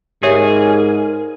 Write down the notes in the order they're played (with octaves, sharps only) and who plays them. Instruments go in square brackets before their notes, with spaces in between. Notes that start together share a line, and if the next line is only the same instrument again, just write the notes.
[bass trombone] G#2 [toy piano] G4 C#5 E5 [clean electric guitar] G#4 [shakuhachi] A#4